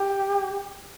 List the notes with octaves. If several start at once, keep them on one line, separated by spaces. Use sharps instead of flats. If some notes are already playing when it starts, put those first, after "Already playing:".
Already playing: G4